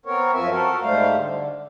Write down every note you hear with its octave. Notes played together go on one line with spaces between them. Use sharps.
B3 C4 A#4 C#5
F#2 F3 C4 E5 G#5
F#4 A4 A#4
G#2 G3 A3 C5 F5
D3